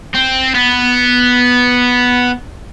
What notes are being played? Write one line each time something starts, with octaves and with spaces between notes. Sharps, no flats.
C4
B3